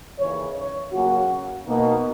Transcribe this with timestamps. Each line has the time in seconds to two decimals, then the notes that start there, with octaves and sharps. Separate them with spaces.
0.19 D#2 C#3 E3 C#5
0.56 C#5
0.93 C#3 F#3 A#3 C#4 F#4
1.67 B2 A#3 D#4